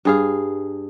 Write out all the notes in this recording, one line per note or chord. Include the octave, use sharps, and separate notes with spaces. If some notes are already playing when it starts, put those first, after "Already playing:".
G2 G#4 F5